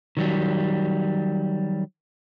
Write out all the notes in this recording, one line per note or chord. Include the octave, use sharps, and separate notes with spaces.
D#3 F#3 G3